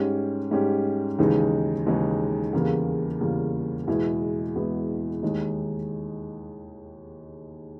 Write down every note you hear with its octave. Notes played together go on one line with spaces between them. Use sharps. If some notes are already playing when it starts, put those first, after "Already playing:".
Already playing: G#2 G3 C#4 G4
G#2 G3 C#4 G4
D#2 C#3 E3 G#3 D#4
D#2 C#3 E3 G#3 D#4
E2 C#3 E3 G3 A#3
E2 C#3 E3 G3 A#3
E2 B2 G#3 B3 E4
E2 B2 G#3 B3 E4
D#2 D#3 G#3 D#4